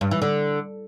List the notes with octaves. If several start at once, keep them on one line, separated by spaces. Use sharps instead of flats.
G2
E3
D3